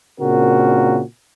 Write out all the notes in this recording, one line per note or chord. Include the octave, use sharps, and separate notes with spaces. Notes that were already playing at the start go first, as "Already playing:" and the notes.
A#2 C#3 C4 D4 F#4 A#4